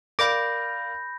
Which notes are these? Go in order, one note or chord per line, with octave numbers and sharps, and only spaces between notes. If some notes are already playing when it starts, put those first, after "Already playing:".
A#4 D5 F5 B5 D6 G6 A#6